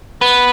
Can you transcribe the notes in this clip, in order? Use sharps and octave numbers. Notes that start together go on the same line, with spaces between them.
B3